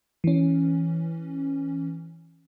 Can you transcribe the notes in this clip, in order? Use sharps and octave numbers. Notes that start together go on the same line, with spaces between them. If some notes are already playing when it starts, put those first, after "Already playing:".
E3 C#4